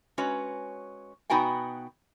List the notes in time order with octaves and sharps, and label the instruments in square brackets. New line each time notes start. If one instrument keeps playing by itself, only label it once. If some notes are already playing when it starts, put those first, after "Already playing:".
[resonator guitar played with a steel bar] G#3 C#4 F#4 B4 C#5
B2 B3 D#4 F#4 G5 G#5